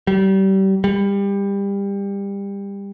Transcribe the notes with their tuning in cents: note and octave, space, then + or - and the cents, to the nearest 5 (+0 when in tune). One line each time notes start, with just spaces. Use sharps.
G3 -30
G3 +25